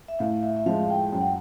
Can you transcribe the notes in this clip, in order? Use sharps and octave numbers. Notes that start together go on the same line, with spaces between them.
E5
A2 F5
E5
E5
F3 G#3 F5
G5
F#2 G5
F#5